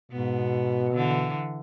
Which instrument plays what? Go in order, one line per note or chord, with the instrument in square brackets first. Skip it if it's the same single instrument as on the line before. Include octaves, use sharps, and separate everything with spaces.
[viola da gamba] G#2 B3 [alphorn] B2
[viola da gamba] D3 E3